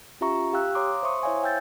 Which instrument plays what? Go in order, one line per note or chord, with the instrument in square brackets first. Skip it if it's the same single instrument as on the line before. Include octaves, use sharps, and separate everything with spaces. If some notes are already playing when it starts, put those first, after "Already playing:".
[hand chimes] C#4 F4 G4 E5 A#5 C#6
G4 F5 G5 E6 F#6
C#5 F5 A#5 C6 D6 D#6
C5 E5 C6 C#6 D#6
E4 C5 C#5 E5 F5 G#5
G5 E6 G6 A6